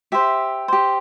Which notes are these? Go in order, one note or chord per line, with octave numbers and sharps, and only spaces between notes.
G4 C5 E5
G4 C5